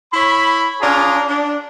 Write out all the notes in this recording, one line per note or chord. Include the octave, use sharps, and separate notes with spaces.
E4 C#5 B5
C#4 D4 F4 G#4 A#5
D4